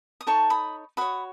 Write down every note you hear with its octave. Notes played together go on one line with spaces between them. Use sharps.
D#6
D#4 A4 C#5 A5 C#6
B5 D#6
F#4 C#5 B5 D#6